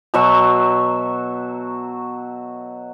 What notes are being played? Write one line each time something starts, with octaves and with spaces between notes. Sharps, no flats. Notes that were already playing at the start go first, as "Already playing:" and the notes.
B2 F#3 E5 C#6